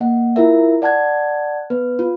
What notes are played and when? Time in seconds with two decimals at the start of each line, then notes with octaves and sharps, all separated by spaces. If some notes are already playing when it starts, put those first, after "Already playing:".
0.01 A#3 D#5 F#5
0.36 E4 F4 A#4 E5
0.82 D5 F#5 A5 F#6 G#6
1.70 B3 B4
1.99 F4